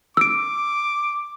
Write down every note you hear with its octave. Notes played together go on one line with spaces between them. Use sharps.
D6 E6 D7